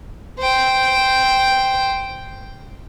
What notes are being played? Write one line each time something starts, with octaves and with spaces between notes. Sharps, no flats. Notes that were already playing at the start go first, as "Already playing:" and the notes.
C5 G5